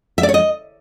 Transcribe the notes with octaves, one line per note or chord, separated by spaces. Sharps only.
E5
D5
C#5
D#5